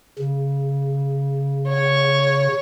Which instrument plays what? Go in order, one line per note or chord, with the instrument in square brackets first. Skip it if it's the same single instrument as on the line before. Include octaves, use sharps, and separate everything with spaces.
[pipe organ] C#3
[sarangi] C#5